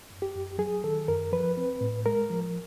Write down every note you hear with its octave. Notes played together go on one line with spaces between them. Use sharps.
F#2
G4
F#2
F#3 G#4
D#3 A4
F#2 A#4
F3 B4
C4
A2
G#3 A#4
F3